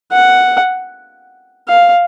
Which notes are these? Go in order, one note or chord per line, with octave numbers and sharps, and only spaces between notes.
F#5
F5